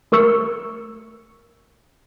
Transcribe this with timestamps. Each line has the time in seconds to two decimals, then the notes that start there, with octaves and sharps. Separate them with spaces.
0.12 A3 A#4 C#6 E6 C#7